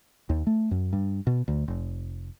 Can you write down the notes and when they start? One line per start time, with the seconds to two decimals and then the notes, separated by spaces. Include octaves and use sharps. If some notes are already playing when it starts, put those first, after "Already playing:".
0.29 D#2
0.47 A3
0.71 F#2
0.93 G2
1.27 B2
1.48 D2
1.68 F1